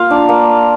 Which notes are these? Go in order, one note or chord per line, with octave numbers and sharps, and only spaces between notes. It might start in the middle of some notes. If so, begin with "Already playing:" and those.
Already playing: A#3 F4 F5
D4
A#3